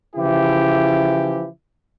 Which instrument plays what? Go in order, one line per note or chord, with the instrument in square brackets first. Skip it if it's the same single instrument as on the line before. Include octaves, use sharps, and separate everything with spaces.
[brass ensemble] C#3 E3 F3 E4 G4